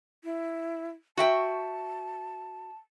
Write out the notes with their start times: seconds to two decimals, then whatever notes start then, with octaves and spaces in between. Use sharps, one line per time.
0.24 E4
1.17 F#4 E5 G5 A5